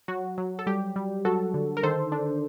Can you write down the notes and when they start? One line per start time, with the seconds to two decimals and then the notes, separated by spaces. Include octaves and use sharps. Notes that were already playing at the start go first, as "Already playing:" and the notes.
0.08 F#3 F#4
0.38 F#3
0.59 A4
0.67 G3 G4
0.96 G3
1.25 F#3 F#4 A4
1.54 D3
1.77 A#4
1.83 D#3 A4 C5
2.12 D4